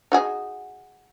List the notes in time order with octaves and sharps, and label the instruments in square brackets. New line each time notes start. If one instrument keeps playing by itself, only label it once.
[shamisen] D#4 F#4 G#4